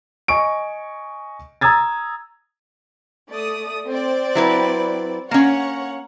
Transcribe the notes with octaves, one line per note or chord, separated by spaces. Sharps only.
D#5 G#5 C#6 D7
A#5 D#6 E6 G#6 A6
A3 D5 D#6
C4 C5 D5
F#3 E4 B4
A#3 C#4 C#5 F#5